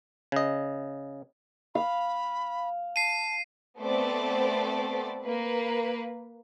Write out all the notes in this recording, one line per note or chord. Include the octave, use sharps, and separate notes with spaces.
C#3 D#5
F5 B5
A5 C7 D#7
A3 B3 C4 A4 C5 D5
A#3 B4